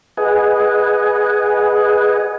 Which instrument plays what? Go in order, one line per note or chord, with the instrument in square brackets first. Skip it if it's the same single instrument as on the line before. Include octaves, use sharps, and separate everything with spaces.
[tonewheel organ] G#4 B4 D#5 F#5 G#5